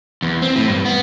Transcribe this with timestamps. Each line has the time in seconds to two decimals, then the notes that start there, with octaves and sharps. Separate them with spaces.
0.22 E2
0.42 C4
0.56 A2
0.68 G2
0.85 B3